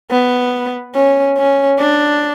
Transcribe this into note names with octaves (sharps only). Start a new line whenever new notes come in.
B3
C#4
C#4
D4